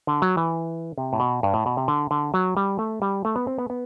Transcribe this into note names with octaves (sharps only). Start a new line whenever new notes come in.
D3
F#3
E3
C3
A2
B2
G2
A2
B2
C3
D3
D3
F#3
G3
A3
G3
A3
B3
C4
B3
B3